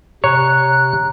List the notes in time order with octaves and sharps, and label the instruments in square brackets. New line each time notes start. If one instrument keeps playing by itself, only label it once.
[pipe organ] C3 F#6 [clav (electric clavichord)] C#5 [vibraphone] A#5